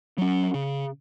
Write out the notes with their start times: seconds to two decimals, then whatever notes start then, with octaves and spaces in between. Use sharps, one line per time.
0.18 F#3 C#4
0.54 C#3